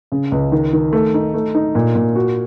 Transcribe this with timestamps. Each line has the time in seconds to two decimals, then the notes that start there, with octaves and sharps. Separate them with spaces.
0.12 C#3
0.32 C#2
0.52 D#3
0.73 D#3
0.93 A3
1.14 D#4
1.34 A3
1.55 D#4
1.75 A#2
1.95 A#2
2.15 F#4